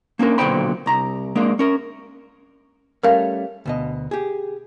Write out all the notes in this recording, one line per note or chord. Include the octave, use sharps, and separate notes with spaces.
A#3 C#4 D4 A#4
B1 A#2 D3 C5 G5 B5
C2 A#5
G#3 A#3 D4
C#4 A#4
G3 A3 C#4 A#4 F5
D2 B2 D#5
G4 G#4